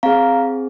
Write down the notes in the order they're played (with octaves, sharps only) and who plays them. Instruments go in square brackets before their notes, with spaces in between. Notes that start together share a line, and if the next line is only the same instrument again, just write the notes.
[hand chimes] C4 G#4 F5 A#5